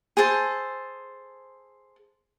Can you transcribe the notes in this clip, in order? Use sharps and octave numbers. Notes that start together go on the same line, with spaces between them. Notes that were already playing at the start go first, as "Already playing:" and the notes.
G#4 A4 C5 A5